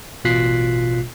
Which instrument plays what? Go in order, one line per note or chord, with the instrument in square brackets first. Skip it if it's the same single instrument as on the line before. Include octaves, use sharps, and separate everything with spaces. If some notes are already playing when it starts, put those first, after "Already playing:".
[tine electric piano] A1 B2 F4 F#6 B6 C7